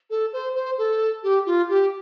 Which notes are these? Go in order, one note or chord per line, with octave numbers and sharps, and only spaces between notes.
A4
C5
C5
A4
G4
F4
G4